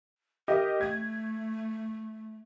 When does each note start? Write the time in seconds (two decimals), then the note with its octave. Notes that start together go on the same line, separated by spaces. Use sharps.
0.48 G4 A#4 D#5
0.81 A3 G#6